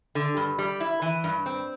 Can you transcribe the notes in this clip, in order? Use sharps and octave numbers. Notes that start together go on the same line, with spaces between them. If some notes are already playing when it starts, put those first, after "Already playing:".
D3
G2
G3
E4
E3
G2
C4